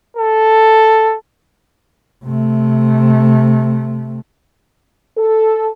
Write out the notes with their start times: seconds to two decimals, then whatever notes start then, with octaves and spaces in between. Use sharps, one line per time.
0.17 A4
2.25 C3 A3
5.17 A4